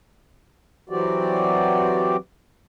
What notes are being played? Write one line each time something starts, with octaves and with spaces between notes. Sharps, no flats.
E3 F#3 C4 F#4 G4 D5